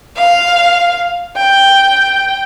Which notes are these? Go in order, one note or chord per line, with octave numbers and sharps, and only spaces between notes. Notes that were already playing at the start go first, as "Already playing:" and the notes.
F5
G5